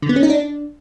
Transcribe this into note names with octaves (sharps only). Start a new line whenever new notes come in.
D3
B3
C#4
D#4
D4